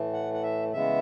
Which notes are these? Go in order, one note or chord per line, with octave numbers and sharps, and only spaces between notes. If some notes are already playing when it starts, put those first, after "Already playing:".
Already playing: A2 E3 A3
F#5
F#5
E5
C#3 E3 G#3 B3 E5